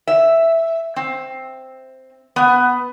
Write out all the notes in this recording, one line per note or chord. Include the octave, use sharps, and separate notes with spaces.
E5
C4
B3